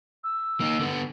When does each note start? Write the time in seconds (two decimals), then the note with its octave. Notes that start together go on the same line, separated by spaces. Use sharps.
0.24 E6
0.60 A#3 D#4
0.79 D3 B3